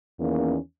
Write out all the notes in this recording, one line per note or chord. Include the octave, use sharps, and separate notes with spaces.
E2 D#3 A#3 C#4